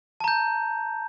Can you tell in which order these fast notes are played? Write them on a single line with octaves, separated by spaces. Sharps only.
A5 A#5 G6